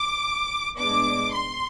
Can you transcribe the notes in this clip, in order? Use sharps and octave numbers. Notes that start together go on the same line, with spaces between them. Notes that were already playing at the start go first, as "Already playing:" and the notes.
Already playing: D6
A2 G#3 B3 D4 D6
C6